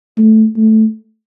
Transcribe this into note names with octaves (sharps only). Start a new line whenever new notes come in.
A3
A3